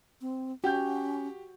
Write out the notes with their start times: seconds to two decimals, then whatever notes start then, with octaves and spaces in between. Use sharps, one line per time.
0.21 C4
0.64 C#4 F#4 G4 G6